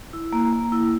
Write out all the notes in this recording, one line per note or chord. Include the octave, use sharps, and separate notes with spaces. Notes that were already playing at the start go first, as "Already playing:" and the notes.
E4
A#3
A#3
E4